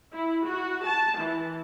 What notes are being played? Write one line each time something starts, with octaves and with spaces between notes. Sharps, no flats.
E4
F#4
A5
E3